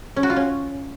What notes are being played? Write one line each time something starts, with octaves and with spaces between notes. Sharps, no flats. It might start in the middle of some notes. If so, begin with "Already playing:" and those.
C#4
F#4
F4
C#4